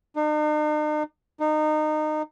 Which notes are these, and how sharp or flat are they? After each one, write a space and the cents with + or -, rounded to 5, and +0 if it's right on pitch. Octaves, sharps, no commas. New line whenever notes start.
D#4 -45
D#4 -25